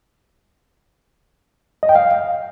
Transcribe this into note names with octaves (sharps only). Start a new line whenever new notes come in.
D#5
G5
F5